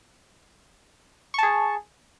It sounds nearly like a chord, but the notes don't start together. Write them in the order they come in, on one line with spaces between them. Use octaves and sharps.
C#6 A5 G#4